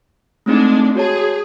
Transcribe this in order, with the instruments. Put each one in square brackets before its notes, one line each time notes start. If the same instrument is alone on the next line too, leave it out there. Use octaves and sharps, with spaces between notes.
[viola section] G#3 D4 [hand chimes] A3 C4 D#4
[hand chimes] F#4 C#5 A5 [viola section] G#4